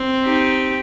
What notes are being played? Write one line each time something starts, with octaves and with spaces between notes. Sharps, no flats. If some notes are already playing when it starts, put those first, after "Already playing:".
Already playing: C4
D#4 G4